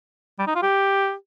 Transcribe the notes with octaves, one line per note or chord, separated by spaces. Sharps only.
G3
D#4
F4
G4